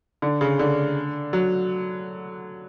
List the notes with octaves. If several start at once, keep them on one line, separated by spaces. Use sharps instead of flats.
D3
C#3
D3
F#3